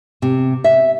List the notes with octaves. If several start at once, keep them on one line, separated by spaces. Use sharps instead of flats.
C3
E5